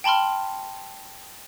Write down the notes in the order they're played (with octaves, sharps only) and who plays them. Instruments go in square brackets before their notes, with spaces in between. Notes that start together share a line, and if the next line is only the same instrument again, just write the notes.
[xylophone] G5 A5 B5 C6 F6